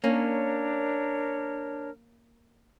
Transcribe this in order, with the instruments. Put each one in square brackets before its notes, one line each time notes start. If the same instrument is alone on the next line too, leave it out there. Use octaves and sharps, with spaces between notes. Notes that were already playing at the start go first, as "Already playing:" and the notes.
[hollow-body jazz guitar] A#3 C#4 [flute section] D4 A#4 C#5